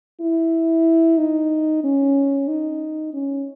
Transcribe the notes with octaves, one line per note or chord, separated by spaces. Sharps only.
E4
D#4
C#4
D#4
C#4